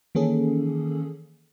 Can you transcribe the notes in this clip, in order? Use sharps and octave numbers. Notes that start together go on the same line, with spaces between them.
D#3 E3 A#3 C#4 G#4 A4